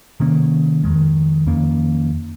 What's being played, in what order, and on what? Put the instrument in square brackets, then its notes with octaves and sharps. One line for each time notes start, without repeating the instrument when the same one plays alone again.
[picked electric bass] C3 D#3 A#3 C#4
F2 D#3 G#3
F2 D#3 A#3 C#4